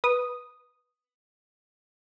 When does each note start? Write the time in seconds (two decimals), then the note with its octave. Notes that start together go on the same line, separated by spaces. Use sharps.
0.04 B4 D#6